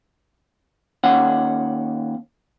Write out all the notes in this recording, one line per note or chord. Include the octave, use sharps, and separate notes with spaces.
D#2 C#4 F#5